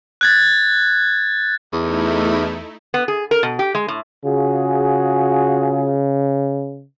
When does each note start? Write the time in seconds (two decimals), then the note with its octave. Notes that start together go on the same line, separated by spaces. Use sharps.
0.21 F#6 G#6 A6
1.73 E2 A3 D#4 E4
2.94 B3
3.08 G#4
3.31 A#4
3.43 B2
3.59 G4
3.75 G#3
3.88 A2
4.25 C#3 F4 F#4 G#4